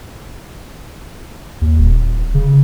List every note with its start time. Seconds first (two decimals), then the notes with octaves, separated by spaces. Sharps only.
1.61 D#2
1.78 D#1
2.34 C#3